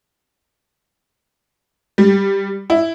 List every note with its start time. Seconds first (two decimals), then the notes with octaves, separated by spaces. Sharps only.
1.98 G3
2.70 E4